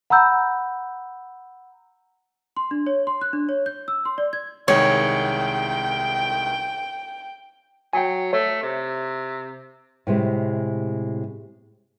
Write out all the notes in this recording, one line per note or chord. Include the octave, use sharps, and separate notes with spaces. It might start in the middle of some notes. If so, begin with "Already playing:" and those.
F#5 A#5 B5 E6 G6
C6
D4
C#5
C6
F#6
D4
C#5
G6
E6
C6
D5
G#6
C2 D#3 G#3 C#5 G5
F#3 G5 G#5
A3 C#5
C3
A2 C3 G#3